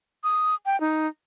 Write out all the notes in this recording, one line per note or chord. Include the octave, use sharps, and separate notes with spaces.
D#6
G5
D#4